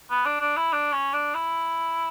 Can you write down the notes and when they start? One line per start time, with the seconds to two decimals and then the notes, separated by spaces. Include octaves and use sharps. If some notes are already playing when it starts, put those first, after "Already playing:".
0.10 B3
0.25 D4
0.40 D4
0.56 E4
0.72 D4
0.92 C#4
1.13 D4
1.34 E4